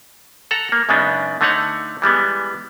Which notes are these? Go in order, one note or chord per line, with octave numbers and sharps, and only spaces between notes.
A4 F#5 A#5
A#3
F#2 C#3 G#3 B3 D4 D#4
D3 A3 D#4 C#5 F#5
E3 G3 G#3 B3